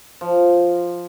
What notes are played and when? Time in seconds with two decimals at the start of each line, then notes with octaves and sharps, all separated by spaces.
0.21 F3